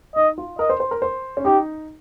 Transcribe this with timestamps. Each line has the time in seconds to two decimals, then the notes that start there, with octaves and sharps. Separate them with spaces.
0.16 D#4 D#5
0.38 F4
0.59 A#4 D#5
0.70 C5
0.80 C5
0.91 A#4
1.02 C5
1.37 C#4
1.45 D#4 G4